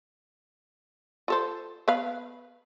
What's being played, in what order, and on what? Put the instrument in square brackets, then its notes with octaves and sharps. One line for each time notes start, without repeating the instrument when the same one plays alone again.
[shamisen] F4 A4 C5
B3 B4 F5